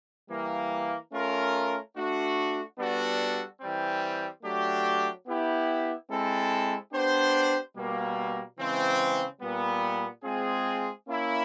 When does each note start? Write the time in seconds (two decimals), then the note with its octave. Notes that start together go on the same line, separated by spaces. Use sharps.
0.29 E3 G3 A#3
1.12 A3 C#4 F4 A#4
1.94 A3 D4 F#4
2.78 G3 B3 D4 F#4 A4
3.60 E3 G3 C4
4.43 F#3 A3 D4 G4
5.26 B3 E4 G4
6.09 G#3 C4 E4 A4
6.91 B3 D4 G4 C5
7.76 B2 G3 A#3
8.58 C#3 E3 G#3 C4
9.41 A#2 G3 B3
10.24 G#3 C4 F4 G#4
11.07 A#3 C#4 E4